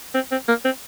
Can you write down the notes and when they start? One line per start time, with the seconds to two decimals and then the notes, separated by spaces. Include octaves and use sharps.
0.14 C4
0.31 C4
0.48 A#3
0.65 C4